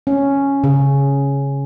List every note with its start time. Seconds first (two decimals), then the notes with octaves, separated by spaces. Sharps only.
0.07 C#4
0.64 C#3